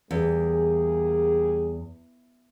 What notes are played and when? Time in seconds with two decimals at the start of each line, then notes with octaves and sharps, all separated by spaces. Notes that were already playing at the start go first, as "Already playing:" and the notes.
0.11 E2 G3 A#3 G#4